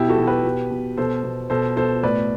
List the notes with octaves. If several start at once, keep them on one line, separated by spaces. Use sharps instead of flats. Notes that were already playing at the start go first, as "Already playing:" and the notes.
Already playing: B2 E4 G4
F#4 A4
B2
G4 B4
B2
B2
B2 A4 C5
B2
B2 A4 C5
B2 A4 C5
A2 B4 D5